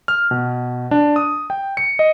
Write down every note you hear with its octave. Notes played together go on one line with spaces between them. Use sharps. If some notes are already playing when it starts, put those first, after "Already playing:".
F6
B2
D4
D#6
G5
C#7
D#5